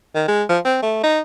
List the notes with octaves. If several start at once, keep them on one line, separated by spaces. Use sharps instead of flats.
D#3
G#3
F3
C4
A3
D#4